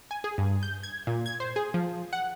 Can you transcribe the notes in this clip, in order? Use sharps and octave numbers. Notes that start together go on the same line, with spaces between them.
G#5
G#4
G2
G6
G#6
A#2
G#6
C5
G#4
F3
F#5